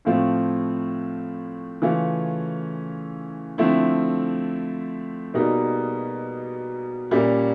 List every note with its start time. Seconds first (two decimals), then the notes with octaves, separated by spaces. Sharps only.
0.05 A2 F3 A3 C4 F4
1.82 C#3 E3 A3 C#4 F4
3.58 D3 F3 A3 C4 E4
5.34 B2 G3 A#3 D#4 G#4
7.11 A#2 G3 A#3 C#4